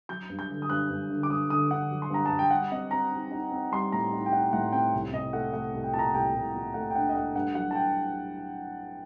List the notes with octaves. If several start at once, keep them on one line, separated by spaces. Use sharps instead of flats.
F#3 G6
G2
G6
D3
D#6
G2 F#6
G2
D3
D6
G2 D#6
D3 D#6
D3 F#5
F#3
C6
G2 A#5
G2 A5
G5
G3 F#5
C4 D#5
C4 A#5
D#4
D#4
C4
G3 C6
A2 A#5
D#4
G5
D#4 F#5
A2 F#5
C4 G5
C2
C2 D#5
A3 F#5
A3 F#5
C2
G5
A#2 A5
A#5
C2 G5
C2
A#2
A3 F#5
G5
D4 F#5
D#5
A3 F#5
G2 F#5
F#3 F#5
A5
G5